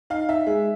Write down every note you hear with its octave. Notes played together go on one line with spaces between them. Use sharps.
D#4 F5
D#4 E5
G#3